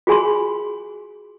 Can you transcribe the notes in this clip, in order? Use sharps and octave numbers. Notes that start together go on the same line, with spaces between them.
F4 F#4 G#4 G#5 B5 C6